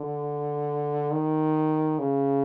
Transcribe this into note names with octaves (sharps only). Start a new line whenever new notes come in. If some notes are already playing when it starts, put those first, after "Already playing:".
Already playing: D3
D#3
C#3